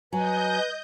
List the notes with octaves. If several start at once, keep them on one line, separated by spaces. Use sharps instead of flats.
F#3 B4 D#5 G#5 G6